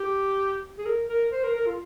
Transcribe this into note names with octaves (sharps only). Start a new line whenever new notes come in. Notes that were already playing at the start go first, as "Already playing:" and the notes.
Already playing: G4
G#4
A#4
A#4
C5
A#4
A#4
F4